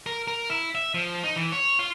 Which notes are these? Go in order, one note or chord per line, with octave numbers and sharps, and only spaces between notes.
A#4
A#4
E4
E5
F3
D#4
E3
C#5
F4